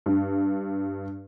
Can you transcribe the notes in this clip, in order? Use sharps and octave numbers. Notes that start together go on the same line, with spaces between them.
G2